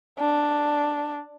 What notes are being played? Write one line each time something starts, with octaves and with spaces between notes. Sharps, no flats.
D4